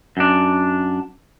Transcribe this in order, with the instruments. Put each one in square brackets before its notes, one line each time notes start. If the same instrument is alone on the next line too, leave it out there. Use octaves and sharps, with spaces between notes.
[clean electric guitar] F#2 D4